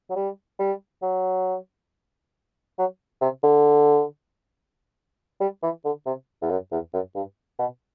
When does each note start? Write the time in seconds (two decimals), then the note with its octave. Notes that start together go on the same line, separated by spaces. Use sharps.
0.10 F#3
0.16 G3
0.59 G3
1.02 F#3
2.78 F#3
3.21 C3
3.43 D3
5.40 G3
5.63 E3
5.85 D3
6.06 C3
6.42 E2
6.50 F#2
6.72 E2
6.93 F#2
7.15 G2
7.59 B2